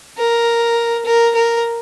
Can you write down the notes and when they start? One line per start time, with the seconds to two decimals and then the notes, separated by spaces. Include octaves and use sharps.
0.18 A#4
1.05 A#4
1.35 A#4